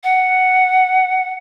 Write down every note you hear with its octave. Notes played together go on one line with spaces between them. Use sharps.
F#5